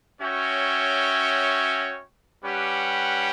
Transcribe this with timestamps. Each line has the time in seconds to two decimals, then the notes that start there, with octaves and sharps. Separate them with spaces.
0.20 C#4 F#4 C#5 E5 G5
2.44 G3 C#4 G4 B4 F#5